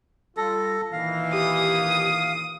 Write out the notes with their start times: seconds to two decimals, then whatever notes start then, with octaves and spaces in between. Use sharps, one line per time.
0.37 G3 F4 A4 A#6
0.93 A#2 D#3 E3 F5
1.33 G4 D#6